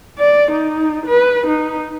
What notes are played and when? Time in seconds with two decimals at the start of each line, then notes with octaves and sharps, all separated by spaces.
0.19 D5
0.52 D#4
1.06 B4
1.47 D#4